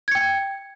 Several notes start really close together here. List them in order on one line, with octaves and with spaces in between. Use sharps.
G#6 C#7 G5